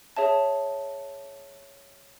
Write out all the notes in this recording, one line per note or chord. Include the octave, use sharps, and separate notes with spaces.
G#4 C#5 E5 A5